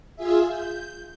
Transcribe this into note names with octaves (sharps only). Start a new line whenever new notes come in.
F4 G#4 E5
G6